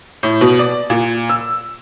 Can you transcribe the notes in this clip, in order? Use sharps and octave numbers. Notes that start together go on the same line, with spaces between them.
A2
B2
D5
A#2
E6